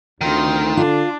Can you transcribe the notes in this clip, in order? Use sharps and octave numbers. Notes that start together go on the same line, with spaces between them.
D2 D#3 C4 F4
D3 D4 F4